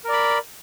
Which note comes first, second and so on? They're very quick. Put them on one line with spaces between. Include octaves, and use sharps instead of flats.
A#4 D5 B5